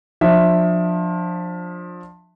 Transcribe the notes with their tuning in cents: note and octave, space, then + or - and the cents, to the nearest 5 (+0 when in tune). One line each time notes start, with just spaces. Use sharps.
F3 +25 D4 +15 E5 +0